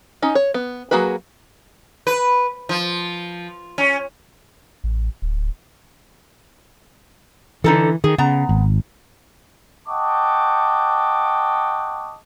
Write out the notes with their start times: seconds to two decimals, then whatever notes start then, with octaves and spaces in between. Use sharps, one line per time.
0.22 C#4 D#4
0.35 C#5
0.54 B3
0.91 F#3 A#3 F#4 G#4 B4
2.07 B4
2.69 F3
3.78 C#4
4.84 A1
5.22 D1
7.64 D3 E3 D#4 A4
8.04 D#3 G#4
8.18 C#3 B3 A#5
8.49 G#1
9.87 D#5 F#5 G5 A5 C#6 D6